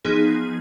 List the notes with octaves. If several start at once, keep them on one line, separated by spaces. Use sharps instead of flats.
F3 B3 D#4 G#4